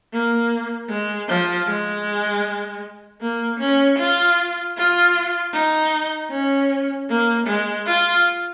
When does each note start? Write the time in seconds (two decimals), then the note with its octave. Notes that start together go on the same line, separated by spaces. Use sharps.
0.13 A#3
0.89 G#3
1.29 F3
1.68 G#3
3.21 A#3
3.60 C#4
3.99 F4
4.77 F4
5.53 D#4
6.31 C#4
7.09 A#3
7.47 G#3
7.86 F4